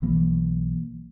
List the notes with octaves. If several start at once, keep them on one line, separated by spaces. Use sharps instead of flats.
B1 E3 A#3